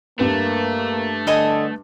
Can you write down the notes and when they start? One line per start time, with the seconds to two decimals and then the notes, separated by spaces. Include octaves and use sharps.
0.19 G2 A3 A#3 B4
1.27 D3 A4 D#5 G#5